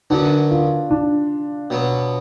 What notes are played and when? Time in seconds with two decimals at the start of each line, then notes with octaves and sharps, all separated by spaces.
0.10 F#2 D3 F#3 B3 D4
0.51 F4
0.90 D4
1.70 B2 F#3 B3